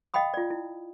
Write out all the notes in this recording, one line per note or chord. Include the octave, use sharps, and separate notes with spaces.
D#5 F5 G5 B5 D#6
F4 D5
E4